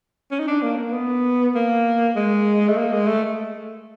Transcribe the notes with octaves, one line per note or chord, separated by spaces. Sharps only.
C#4
D#4
D4
A#3
A#3
B3
A#3
G#3
A3
A#3
G#3
A3